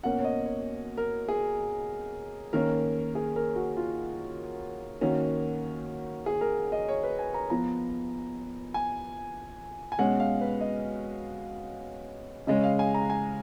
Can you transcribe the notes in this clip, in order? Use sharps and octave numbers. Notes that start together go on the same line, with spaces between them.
B2 A#3 C#4 F#5
C#5
D#5
C#5
A#4
G#4
D#3 A#3 C#4 A#4
G#4
A#4
F#4
F4
D#3 A#3 C#4 F#4
G#4
A#4
D#5
C#5
B4
G#5
A#5
F3 B3 A#5
G#5
G#5
B2 G#3 C#4 F#5
F5
B4
D#5
C#3 G#3 C#4 D#5
F5
G#5
A#5
G#5